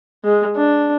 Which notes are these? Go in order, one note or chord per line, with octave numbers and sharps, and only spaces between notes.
G#3
D4